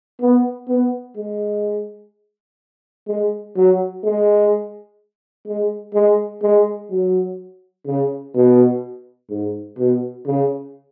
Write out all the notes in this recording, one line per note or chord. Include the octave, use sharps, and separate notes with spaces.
B3
B3
G#3
G#3
F#3
G#3
G#3
G#3
G#3
F#3
C#3
B2
G#2
B2
C#3